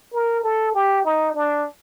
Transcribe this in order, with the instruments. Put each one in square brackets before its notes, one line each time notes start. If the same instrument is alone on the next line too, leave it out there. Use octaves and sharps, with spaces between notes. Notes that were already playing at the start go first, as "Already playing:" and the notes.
[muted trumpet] A#4
A4
G4
D#4
D4